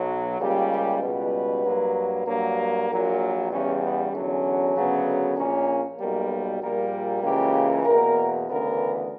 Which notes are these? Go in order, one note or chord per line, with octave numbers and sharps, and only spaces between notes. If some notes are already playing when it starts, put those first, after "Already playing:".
Already playing: B1 B2 F#3
C#2 C#3 G3 A#3 G4
G4
C#2 B2 G3 B4
G2 F#3 A#3
G2 F#3 A#3
A#1 A#2 F#3 A#4
E2 C#3 G3 B3 C#4
B3
E2 D3 F#3 C#4
D2 C#3 F#3 B3
A#1 A#2 A#3 C#4
B1 B2 G3 A#3 A#4
A#1 A#2 G3 A#3 A#4
C#2 C#3 E3 A#3 G4
E2 B2 A#3 A#4
D2 C#3 E3 B3 A#4